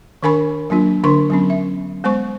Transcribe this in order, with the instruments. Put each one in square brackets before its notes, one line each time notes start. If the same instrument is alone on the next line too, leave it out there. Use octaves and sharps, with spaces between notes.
[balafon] D#3 D4 A#4 G#5 B5 C#6
F#3 A#3 D4 F4
D3 D4 A#4 C6 C#6
F#3 B3 C#4
E5
G#3 B3 C5 C#6